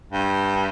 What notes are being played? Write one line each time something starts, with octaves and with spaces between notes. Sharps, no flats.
G2